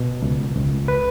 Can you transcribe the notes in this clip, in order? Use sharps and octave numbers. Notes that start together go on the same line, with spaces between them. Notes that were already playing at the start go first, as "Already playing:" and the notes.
Already playing: B2
C#2
C#2
B4